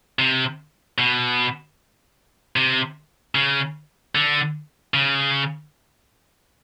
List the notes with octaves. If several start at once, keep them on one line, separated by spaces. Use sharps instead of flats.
C3
B2
C3
C#3
D3
C#3